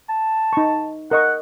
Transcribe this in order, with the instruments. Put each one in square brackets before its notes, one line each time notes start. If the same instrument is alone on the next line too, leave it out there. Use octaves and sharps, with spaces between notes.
[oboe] A5
[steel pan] D#4 C#6
[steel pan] A#4 D#5 C#6 [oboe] F#5